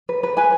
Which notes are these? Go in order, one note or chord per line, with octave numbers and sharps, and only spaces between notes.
B4
B4
B4 G#5